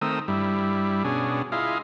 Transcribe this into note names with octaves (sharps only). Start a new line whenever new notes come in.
D#3 A3 C4 A#4 D#6 E6
G2 G3 E4
B2 C#4 D4 G#4
E4 F4 G#4 D#5 F5